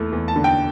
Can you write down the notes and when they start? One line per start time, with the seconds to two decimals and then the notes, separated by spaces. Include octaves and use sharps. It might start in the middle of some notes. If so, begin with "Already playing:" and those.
Already playing: E2 A3 E4
0.12 E2
0.28 A5
0.36 D3
0.44 G5